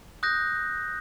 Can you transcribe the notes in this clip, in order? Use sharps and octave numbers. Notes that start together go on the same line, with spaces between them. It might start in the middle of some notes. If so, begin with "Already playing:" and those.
D#6 F#6 G6 A#6